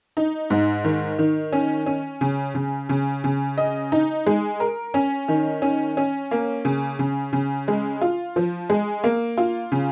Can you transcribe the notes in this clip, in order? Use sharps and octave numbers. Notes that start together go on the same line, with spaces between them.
D#4
G#2
D#3
D#3
C#4
C#4
C#3
C#3
C#3
C#3
D#5
D#4
G#3
A#4
C#4
D#3
C#4
C#4
A#3
C#3
C#3
C#3
G#3
F4
F3
G#3
A#3
F4
C#3